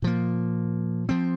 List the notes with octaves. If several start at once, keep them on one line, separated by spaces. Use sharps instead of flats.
A#2 F3 A#3
F3 C4